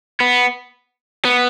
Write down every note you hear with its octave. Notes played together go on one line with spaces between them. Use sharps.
B3
B3